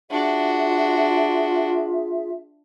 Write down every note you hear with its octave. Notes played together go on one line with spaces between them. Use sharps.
D4 F4 F#4 G#4 E5